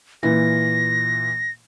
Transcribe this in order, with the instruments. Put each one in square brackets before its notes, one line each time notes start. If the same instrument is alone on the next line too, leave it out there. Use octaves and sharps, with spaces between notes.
[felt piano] A#2 E3 [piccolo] A#6